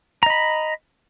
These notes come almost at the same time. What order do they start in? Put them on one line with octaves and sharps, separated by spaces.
A#5 D#5 B5